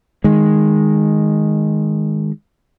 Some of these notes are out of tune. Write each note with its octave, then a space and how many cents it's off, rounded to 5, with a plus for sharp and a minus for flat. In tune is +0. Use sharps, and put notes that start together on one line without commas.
D#3 +0 G#3 +0